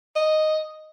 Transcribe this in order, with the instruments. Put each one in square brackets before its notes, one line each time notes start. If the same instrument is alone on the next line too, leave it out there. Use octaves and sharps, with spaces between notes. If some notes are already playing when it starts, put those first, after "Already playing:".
[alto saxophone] D#5